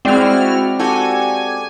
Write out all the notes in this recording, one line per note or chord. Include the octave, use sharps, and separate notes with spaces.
G#3 C4 E4 F#4 D5 G5 F6
F#4 G4 A4 G#5